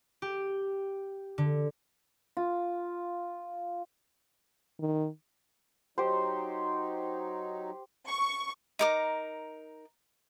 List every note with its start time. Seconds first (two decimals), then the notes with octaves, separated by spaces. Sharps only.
0.22 G4
1.38 D3
2.37 F4
4.79 D#3
5.98 F#3 D#4 G4 C5
8.08 C#6
8.79 D#4 A#4 D6